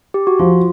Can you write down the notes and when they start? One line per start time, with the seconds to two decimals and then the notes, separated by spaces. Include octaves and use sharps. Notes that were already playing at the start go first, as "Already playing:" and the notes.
0.14 G4
0.27 F#4
0.39 F3 F4